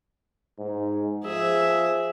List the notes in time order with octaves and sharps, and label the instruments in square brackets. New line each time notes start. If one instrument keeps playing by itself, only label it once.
[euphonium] G#2
[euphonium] F3 [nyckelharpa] G#4 E5